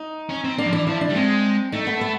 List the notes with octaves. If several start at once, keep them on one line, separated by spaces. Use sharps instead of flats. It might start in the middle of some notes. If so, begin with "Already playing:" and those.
Already playing: D#4
C#4
C4
A#3 D4
F3
E3 D4
F3 E4
D4
G3
G#3 C4
A3 D#4
B3
B3